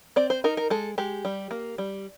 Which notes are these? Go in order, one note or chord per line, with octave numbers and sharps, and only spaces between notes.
C4 D5
C5
D#4 A#4
A#4
G#3 A4
G#3 G4
G3
A#3
G3